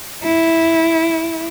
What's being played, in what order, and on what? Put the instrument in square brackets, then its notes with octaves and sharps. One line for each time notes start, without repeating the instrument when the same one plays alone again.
[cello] E4